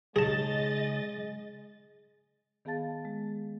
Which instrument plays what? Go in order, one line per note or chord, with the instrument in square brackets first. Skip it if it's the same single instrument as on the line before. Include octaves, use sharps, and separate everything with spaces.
[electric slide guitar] C#3 D#4 C#5 [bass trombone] G#3 [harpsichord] G#4 A5 [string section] D#5 A6
[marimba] D#3 B3 G#4 F5 A5 A6
G#3